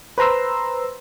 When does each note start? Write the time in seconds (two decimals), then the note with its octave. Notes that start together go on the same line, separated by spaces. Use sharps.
0.18 B4 C5 A#5 C6 E6